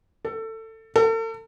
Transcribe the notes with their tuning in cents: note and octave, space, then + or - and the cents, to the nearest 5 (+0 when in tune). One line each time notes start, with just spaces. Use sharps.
A4 +20
A4 +40